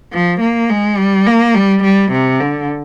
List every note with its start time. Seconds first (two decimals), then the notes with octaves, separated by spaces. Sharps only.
0.13 F3
0.41 A#3
0.70 G#3
0.97 G3
1.27 A#3
1.54 G3
1.83 G3
2.12 C3
2.40 D3